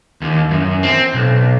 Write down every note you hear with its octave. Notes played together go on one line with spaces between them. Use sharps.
D#2
F#2
C4
B1